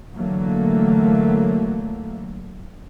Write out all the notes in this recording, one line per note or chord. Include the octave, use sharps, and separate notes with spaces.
D3 E3 F#3 A3 A#3